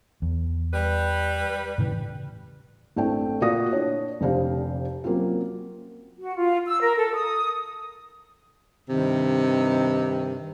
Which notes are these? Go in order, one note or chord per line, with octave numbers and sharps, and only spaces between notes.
E2
G3 B4
A2 C#3 E3
A1 A3 C4 D4 G5
A#2 A#3 F#4 D5 D#6 A#6
D4 E4 C#5 D5
F1 C3 D4 G4 C5 F5
F#3 A#3 C4 C#4 F4
F#4
F4
E6
A#4
A4
D#6
G2 C3 D#3